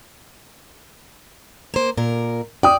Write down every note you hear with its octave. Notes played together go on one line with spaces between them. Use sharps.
A#3 C5
A#2 A#4
D5 G5 D#6